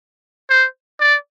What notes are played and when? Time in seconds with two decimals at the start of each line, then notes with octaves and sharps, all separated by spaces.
0.49 C5
1.00 D5